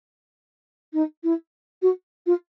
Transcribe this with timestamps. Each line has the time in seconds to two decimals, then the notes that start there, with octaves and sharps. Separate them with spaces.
0.93 D#4
1.23 E4
1.82 F#4
2.26 F4